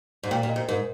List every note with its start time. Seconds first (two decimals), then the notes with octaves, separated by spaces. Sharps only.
0.23 G#2
0.31 A#2 G5
0.43 A#2
0.49 D#5
0.56 G#2
0.68 G#2 A#4